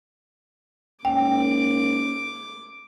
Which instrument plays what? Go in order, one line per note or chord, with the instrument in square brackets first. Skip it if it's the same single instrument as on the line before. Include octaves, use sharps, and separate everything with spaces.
[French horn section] G#2 A#3 C#4 [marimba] G5 [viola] D6